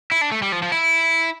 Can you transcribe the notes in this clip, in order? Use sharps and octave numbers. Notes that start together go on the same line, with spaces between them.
E4
D4
A3
G3
F3
F3
E4